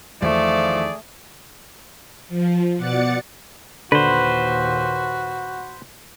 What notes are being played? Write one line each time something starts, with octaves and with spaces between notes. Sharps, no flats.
E2 D#3 F3 A3 G#4 D5
F3
B2 D5 F#5 A6 C#7
D#2 A#2 D3 F#4 B4 C5